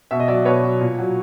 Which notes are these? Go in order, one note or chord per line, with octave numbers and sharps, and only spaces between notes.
B2 E5
D#5
F#3 D5 E5
B2 B4 C#5
F#3
A#2
F#3